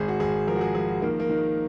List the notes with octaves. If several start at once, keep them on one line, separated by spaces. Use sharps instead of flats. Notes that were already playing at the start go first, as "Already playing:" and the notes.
Already playing: G#1 G#4
F#4
G#1 G#4
F3 A#4
F#4
G#4
F3 G#4
F#4
D#3 A#3
A#3
D#3